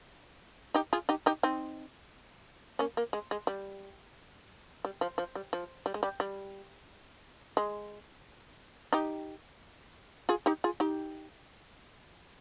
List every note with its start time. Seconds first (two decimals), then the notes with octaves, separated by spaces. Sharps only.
0.75 D#4 G4
0.93 F4 G#4
1.09 D#4 G4
1.26 D#4 G4
1.43 C4 D#4
2.79 A#3 C#4
2.97 A#3
3.13 G#3
3.31 G#3
3.47 G3
4.85 G3
5.01 F3
5.18 F3
5.35 G3
5.53 F3
5.86 G3
5.94 G#3
6.03 G3
6.20 G3
7.57 G#3
8.93 D#4 G4
10.29 F4 G#4
10.46 D#4 G4
10.64 F4 G#4
10.80 D#4 G4